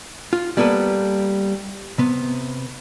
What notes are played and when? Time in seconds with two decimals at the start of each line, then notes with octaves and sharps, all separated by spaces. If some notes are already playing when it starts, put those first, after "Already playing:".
0.33 F4
0.57 G3 A#3 B3 A4 B4
1.98 C3 B3